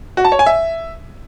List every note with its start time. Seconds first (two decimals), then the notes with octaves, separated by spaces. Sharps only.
0.17 F#4
0.25 A5
0.32 C#5
0.39 G#5
0.47 E5